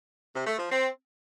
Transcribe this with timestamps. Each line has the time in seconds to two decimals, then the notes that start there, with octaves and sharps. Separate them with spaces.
0.35 C3
0.47 A3
0.59 F3
0.70 C4